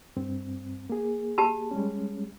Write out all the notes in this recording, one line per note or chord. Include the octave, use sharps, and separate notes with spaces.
G2 C4
A#3 G#4
G4 A5 B5
G3 G#3 C#4